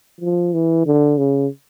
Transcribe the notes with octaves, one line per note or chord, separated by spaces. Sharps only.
F3
E3
D3
C#3